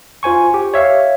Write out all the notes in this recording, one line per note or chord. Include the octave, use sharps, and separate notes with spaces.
F4 C5 G#5 C#6
G4
C#5 E5 F5